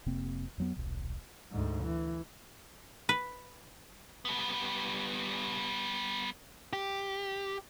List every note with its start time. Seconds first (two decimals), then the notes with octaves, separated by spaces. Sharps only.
0.06 F1 C3 A#3 C4
0.58 F2 F#3 B3
0.76 D#1 B1
1.51 D2 G#2
1.83 E3
3.09 B4
4.25 G3 B3
6.73 G4